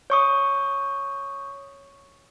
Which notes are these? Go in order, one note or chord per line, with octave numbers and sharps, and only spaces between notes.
C#5 C#6 D#6